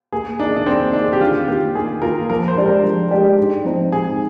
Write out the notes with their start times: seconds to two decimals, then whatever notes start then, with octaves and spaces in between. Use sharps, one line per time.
0.13 A#3 G#4
0.39 D4 D#4
0.44 G#4
0.56 D4
0.66 A#3 C4
0.93 D4 D#4
0.98 G#4
1.13 G4
1.20 D#3 F4
1.48 A#3 F4 G4
1.75 D#3 G#4
2.02 A#3 F4 A#4
2.30 F3 A#4
2.48 C5
2.56 G#3 D4 G4 D5
2.66 A#4
2.83 F3
3.11 G#3 D4 G4 D5
3.38 G#2
3.65 F3 C4 D#4
3.92 G#2 G#4